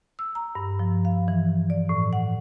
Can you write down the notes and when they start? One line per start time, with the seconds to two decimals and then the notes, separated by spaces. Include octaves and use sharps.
0.19 E6
0.35 A#5
0.55 G2
0.79 F3
1.05 F5
1.28 E3
1.70 D5
1.89 A2
2.13 F#5